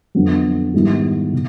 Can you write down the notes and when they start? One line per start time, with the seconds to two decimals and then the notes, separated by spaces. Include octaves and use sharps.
0.15 F2 D3 F#3 B3
0.74 G#2 D#3 G3 B3 E4
1.33 B2